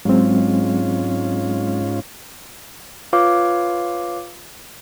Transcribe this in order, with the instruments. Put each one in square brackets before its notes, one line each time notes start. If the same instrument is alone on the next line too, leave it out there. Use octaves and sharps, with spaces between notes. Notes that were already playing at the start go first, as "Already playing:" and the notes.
[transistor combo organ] G#2 C#4 F4 [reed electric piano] F#3 G#3 C4
[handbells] F4 B4 C#5 F5 D6